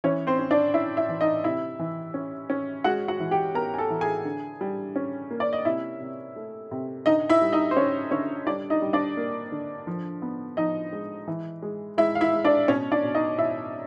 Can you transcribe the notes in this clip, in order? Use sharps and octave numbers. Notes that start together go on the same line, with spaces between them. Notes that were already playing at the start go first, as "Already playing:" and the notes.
E3 C#4 C#5
C4 C5
C#4
D4 D5
C#4 E4 E5
E4 E5
E3
D#4 D#5
C3 E4 E5
E3
C#4
C#4
G#3 F#4 F#5
F#4 F#5
E3
G4 G5
B3 A#4 A#5
G#5
A4 A5
E3
G#4 G#5
D3
G3
C#4
A#3
D5
D#5
C3 E4 E5
C3
A3
C3
D3 D#4 D#5
E4 E5
G3
D#4 D#5
C5
D3 C#4 C#5
D3 C#4 C#5
G3 D4 D5
D#4 D#5
G3
D4 D5
A#3
D3
F3
B3
F3 D#4 D#5
G#3
E3
G#3
G#3 E4 E5
F5
E4 E5
G#3
D4 D5
B2 C#4 C#5
D4 D5
B2
D#4 D#5
B2 E4 E5